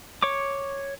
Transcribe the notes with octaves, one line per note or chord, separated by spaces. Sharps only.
C#5 C#6 D6